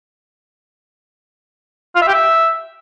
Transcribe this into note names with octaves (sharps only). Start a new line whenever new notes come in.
F4
E5
G4
E5